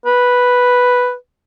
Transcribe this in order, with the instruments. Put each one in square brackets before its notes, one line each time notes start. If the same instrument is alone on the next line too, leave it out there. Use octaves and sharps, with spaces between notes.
[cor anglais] B4